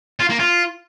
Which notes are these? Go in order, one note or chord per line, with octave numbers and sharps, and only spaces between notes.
F4
A#3
F4